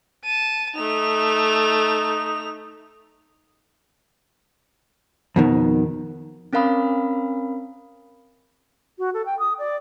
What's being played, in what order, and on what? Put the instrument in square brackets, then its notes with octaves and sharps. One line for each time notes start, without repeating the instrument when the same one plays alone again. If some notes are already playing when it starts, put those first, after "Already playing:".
[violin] A5 D#7
[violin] A3 F7 [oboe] D#4
[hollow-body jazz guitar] F2 B2 D#3
[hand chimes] C4 C#4 A#4 F5 B5 D#6
[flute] F#4
A4
G5
D#6
D5